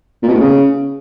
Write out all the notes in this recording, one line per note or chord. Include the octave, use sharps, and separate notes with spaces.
A#2
B2
A2
C#3